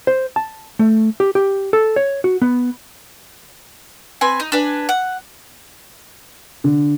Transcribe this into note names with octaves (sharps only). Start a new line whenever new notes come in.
C5
A5
A3
G4
G4
A4
C#5
F#4
B3
C4 B4 G#5
D#4
D4 B4 G#5
F#5
D3